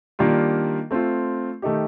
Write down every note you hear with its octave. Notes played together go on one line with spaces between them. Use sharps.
D#3 G3 A#3 D4 F4
A3 C4 F4
D#3 A3 D#4 G4